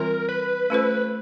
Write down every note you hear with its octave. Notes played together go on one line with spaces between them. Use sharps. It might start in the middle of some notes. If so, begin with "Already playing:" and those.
Already playing: E3 G3 C4 F4 A#4
B4
A3 C#4 F4 A4 C5